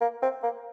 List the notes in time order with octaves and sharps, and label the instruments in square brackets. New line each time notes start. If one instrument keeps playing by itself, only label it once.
[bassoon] A#3
C4
A#3